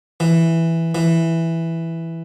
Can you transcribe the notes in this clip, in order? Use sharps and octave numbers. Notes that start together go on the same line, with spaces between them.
E3
E3